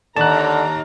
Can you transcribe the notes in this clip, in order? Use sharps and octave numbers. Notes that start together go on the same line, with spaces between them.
D#2 D3 A5 A#5 F#6